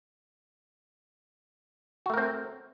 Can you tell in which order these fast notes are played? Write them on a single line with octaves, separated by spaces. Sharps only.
F#4 A3 A#4 C4